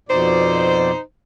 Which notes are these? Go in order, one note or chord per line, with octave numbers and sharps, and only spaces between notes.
F2 B2 D#4 C5 D5